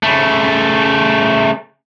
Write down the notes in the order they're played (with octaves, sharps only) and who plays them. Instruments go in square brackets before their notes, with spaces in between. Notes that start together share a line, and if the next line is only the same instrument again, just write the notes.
[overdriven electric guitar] C#3 A3